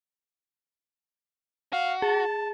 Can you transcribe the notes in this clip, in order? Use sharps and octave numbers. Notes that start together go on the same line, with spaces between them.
F#4 F5
G#4 A5